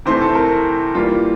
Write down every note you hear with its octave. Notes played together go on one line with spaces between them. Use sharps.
C3 E3 A3 C4 C5
A4
A#4
E3 G3 A#3 F4